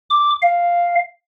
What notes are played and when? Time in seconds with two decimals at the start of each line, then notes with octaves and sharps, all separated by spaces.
0.10 D6
0.42 F5